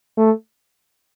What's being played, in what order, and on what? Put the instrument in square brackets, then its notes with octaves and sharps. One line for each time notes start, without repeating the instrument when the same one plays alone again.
[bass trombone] A3